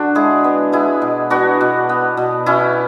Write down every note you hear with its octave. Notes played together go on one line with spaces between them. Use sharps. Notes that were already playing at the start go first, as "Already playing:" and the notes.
Already playing: D3 D4 F#4
G#3 E4 G#4
B3
G#3 E4 G#4
B2
B3 D4 F#4
B2
B3
B2
B2 C#4 E4